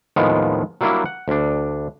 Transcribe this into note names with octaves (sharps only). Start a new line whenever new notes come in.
D#2 A2 D#3 F3 G#3 B3
F#3 G3 A#3 D4 E4 F#4
F#5
D2 D4